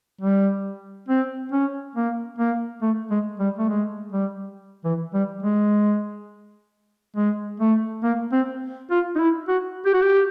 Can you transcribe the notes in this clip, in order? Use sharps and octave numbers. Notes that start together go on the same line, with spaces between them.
G3
C4
C#4
A#3
A#3
A3
G#3
G3
A3
G#3
G3
E3
G3
G#3
G#3
A3
A#3
C4
F4
D#4
E4
F#4
G4
F#4
G4